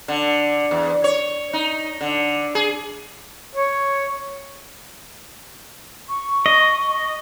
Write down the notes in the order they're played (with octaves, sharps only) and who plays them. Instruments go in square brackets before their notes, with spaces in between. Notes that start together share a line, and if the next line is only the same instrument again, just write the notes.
[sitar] D3
E2
C#5
D#4
D3
G#4
[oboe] C#5
[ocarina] C#6
[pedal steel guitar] D#5